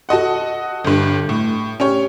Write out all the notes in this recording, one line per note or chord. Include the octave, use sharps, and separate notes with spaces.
F#4 A4 D#5 F#5
G1 G2
A2
C#4 G4 C#5